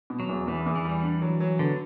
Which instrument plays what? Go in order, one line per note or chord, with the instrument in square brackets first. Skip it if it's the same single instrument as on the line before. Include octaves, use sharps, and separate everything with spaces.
[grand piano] B2
[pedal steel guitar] F#3
[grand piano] E2
[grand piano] E2 [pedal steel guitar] E3
[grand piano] E2
[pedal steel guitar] E3
[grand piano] G3
D4
F#3
F#3
[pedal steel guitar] D3 [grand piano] B3